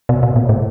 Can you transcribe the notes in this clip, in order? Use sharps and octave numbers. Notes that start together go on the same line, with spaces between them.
B2
B2
A#2
A2